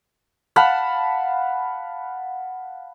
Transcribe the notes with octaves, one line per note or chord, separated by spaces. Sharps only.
F5 F#5 A5 B5